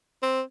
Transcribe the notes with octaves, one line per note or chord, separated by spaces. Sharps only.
C4